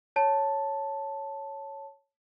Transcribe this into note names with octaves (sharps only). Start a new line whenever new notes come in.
C#5 A5